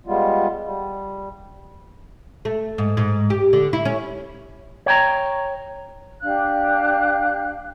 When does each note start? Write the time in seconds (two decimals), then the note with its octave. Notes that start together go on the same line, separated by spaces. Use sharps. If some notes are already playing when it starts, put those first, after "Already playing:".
0.06 G3 G#3 B3 F4
0.65 G3
2.45 A3
2.78 G#2
2.97 G#2
3.30 G4
3.53 D3
3.73 E4
3.85 C#4
4.86 C#5 G5 A#5
6.21 D4 G4 F5 F#6